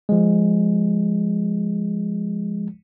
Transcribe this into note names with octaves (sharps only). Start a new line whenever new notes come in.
F3 G#3